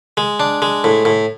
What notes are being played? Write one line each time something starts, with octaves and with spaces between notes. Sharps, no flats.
G#3
D4
G#3
A2
A2